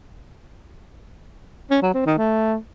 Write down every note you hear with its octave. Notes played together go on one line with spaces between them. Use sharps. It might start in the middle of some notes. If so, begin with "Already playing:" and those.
C#4
F#3
C4
D#3
A3